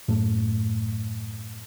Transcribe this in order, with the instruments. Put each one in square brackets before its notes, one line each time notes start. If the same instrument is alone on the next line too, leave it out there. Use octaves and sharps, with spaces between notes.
[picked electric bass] F#2 A2 A3